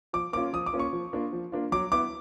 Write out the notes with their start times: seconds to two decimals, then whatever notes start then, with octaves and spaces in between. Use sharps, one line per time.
0.13 F3 D6
0.33 A#3 C#4 F4 D6
0.53 F3 D#6
0.66 D6
0.73 A#3 C#4 F4
0.79 C#6
0.93 F3
1.13 A#3 D4 F4
1.33 F3
1.52 A#3 D4 F4
1.72 F#3 D6
1.92 B3 E4 D6